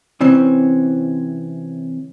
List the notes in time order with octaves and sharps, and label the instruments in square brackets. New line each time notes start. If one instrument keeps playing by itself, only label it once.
[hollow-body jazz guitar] C3 E3 C4 C#4